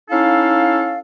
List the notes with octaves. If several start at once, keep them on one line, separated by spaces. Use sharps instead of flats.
C#4 D#4 E4 A4 F5